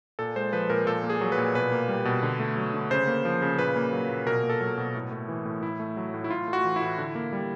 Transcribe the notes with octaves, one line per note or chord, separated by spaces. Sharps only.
A#2 A4
G#3 C5
F3 B4
A#2 A#4
A#2 A4
A#3
G#4
F#3
B4
A#2
B2 B4
A#3
G3
B2
D3
A3
F#3
D3
C#3 C5
A#3
F3
C#3
A#2 B4
A#3
F#3
A#2
B2 A#4
A#3
A4
F#3
B2
A2
A3
E3
A2
A2 E4
A3
F#3
A2
E4
A2 F4
A3
F#4
E3
E4
A2
D3
A#3
G3